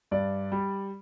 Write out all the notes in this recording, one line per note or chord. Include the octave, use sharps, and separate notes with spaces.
G2 D5
G3